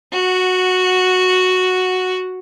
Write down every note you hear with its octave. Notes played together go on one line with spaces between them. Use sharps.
F#4 F#5